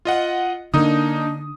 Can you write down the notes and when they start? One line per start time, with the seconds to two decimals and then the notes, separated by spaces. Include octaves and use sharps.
0.05 F4 D#5 F#5
0.74 D3 A#3 D4 D#4 D#6